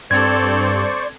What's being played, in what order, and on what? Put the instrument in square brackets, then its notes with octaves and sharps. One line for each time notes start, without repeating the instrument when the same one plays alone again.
[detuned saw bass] G2 [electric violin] C4 A4 [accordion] C5 D5 C#6 [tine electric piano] G#6